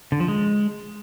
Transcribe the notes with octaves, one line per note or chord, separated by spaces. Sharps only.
D3
F3
G#3